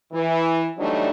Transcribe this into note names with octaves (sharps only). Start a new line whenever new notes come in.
E3
E3 F#3 G3 A3 D4 D#4